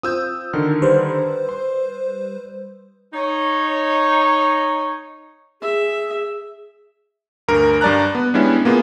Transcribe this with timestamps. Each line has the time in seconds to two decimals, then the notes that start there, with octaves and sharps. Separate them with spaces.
0.03 C4 F4 D#6 E6 G6
0.53 D3 D#3 F6
0.82 G3 B4 C5
1.49 C6
3.13 D#4 C#5
5.62 G#4 E5
7.48 D2 G2 A#4
7.81 G2 G3 D5 A5 A#5 F#6
8.15 B3
8.34 G3 G#3 B3 C#4 D4 E4
8.65 A#3 B3 F4 G#4